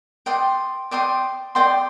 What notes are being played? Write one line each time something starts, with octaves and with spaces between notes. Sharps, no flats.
D5 G5 C6 D#6
D5 G5 C6 D#6
D5 G5 C6 D#6